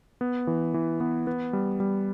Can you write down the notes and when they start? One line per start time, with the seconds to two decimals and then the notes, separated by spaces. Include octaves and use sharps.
0.21 B3
0.47 E3
0.74 E3
1.00 B3
1.27 B3
1.53 G3
1.80 G3